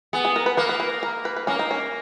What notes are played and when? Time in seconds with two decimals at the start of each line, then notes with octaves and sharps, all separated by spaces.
0.13 B3 G#4
0.25 G#4
0.36 A#4
0.46 B4
0.57 A#3 B4
0.69 B4
0.80 B4
1.03 A#4
1.25 B4
1.36 B4
1.47 A#3 C#4
1.59 D#4
1.71 C#4